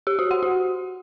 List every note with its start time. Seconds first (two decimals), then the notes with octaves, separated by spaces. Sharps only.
0.07 G4
0.19 F#4
0.31 F#5
0.43 F#4